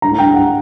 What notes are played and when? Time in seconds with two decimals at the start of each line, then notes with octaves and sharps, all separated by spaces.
0.02 G2 A#5
0.11 A2
0.19 G2 G5
0.34 F#5